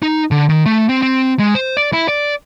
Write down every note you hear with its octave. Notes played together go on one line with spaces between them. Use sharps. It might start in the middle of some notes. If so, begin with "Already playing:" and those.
D#4
D3
D#3
A3
C4
C4
G#3
C5
D5
E4
D5